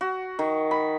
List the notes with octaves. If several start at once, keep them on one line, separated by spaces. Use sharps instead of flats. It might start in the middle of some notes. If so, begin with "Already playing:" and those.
F#4
D#3
B5